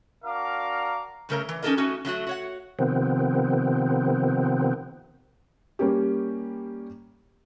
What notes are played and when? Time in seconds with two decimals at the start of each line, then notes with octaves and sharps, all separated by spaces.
0.24 D4 F#4 A#4 F5 A#5 D6
1.29 G2 C#3 A3 A#4 C#5 A#5
1.49 E3
1.62 C#4 D#4 G4 A4 A#4 D#5
1.77 A3 C#4 D#4 F#4
2.05 D3 F#3 A3 F#4
2.27 F#4 C#5 F#5
2.79 C3 D#3 F3 B3 C4
5.79 G3 A#3 C#4 G4